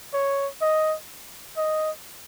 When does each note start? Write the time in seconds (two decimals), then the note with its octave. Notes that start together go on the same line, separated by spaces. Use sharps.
0.14 C#5
0.61 D#5
1.57 D#5